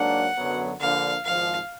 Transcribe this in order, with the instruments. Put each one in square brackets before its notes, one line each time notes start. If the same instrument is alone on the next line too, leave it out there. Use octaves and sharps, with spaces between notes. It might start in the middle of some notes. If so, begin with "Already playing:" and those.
Already playing: [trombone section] G#2 F#3 A#3 D4 [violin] F#5
[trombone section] F#2 D3 F#3 B3
[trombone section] D3 F3 A#3 D4 [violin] F5
[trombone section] G#1 G#2 F3 [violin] F5